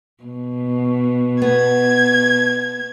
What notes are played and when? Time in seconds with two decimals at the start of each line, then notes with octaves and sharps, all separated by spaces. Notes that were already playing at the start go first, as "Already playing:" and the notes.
0.24 B2
1.42 B3 G#6